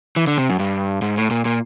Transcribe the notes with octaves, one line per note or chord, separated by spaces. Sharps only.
E3
D3
C3
F#2
G2
G#2
A2
A#2
A#2